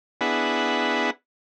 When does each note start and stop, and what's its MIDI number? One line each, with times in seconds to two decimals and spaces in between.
0.21 1.10 59
0.21 1.10 62
0.21 1.10 64
0.21 1.10 68
0.21 1.10 78
0.21 1.10 83